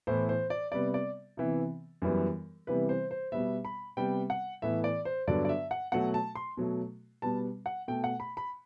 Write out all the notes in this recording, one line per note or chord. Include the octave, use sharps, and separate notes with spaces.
A2 E3 B3 C5
C5
D5
C3 G3 B3 D5
D5
C3 E3 B3
F#2 E3 G3 B3
C3 E3 G3 B3 B4
C5
C5
B2 G3 B3 E5
B5
C3 G3 B3 G5
F#5
A2 E3 B3 E5
D5
C5
G2 D3 F#3 B3 D5
D5
E5
F#5
B2 F#3 A3 F#5
A5
C6
B2 F#3 A3
B2 G3 B3 A5
F#5
B2 A3 G5
F#5
B5
B5